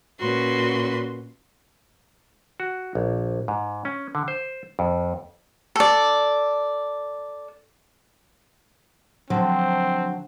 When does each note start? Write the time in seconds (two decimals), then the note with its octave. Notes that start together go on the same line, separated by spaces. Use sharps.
0.20 A#2 C#4 F#4 B4 C6
2.60 F#4
2.95 A#1
3.48 G#2
3.85 C#4
4.15 D3
4.28 C5
4.79 F2
5.76 A4 D5
9.30 D3 F3 F#3 C4